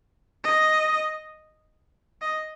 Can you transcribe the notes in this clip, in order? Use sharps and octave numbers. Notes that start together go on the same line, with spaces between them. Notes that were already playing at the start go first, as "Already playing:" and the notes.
D#5
D#5